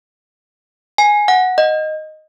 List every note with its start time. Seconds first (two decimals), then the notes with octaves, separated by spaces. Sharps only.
0.98 G#5
1.28 F#5
1.58 D#5